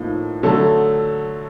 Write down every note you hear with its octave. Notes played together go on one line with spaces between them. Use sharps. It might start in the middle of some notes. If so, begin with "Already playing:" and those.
Already playing: A2 F3 A#3 D#4
D3 F#3 A3